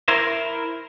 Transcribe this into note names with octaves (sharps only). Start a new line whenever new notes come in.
E4 A#4 C5